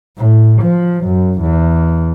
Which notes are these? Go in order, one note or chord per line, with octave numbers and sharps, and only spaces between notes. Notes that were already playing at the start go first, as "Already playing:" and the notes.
A2
F3
F#2
E2